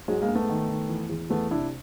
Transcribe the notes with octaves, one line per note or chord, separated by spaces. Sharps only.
G#2 F#3 G#3
G#3 A#3
G#2
A3 B3
D#3
D#3
E3
E2
E2 A3 B3
C3 D4 E4